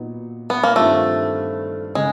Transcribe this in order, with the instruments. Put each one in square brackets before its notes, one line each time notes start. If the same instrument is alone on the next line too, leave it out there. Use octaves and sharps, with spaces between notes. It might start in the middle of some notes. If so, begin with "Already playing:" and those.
Already playing: [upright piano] A#2 F#3 B3 D#4
[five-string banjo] B3
A#3
[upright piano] G2 D#3 G3 C4 F4 [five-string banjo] A3
[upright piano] C#3 [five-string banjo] G#3